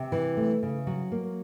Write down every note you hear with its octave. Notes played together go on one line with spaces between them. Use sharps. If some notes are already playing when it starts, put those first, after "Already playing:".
Already playing: C3
E3
A3
C#3
F#3 F#4
A#3